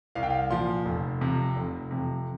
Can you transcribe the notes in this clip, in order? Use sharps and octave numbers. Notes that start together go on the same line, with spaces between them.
C2 F5
G5
F5
A#2 F3 C6
F1
F2 C3
F1
F2 C3